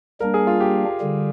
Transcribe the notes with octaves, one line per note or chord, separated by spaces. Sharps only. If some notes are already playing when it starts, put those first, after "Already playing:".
G3 A#3 D4 A#4
G#4
F4
G4
D3 G3